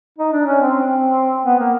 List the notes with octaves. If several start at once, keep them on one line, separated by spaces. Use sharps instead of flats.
D#4
D4
C#4
C4
B3
A#3